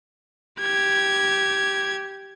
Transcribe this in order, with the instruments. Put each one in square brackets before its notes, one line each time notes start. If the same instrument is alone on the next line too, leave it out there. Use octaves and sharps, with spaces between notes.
[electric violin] G4 G#6